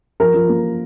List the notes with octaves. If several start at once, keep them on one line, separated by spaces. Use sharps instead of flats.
F3 A#4
F3
A#3